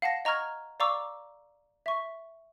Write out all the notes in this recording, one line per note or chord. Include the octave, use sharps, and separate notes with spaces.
F5 F#5 A5 A#6
D#5 A#5 C#6 F6 G#6
D5 F5 A#5 C#6 D6 E6
E5 C#6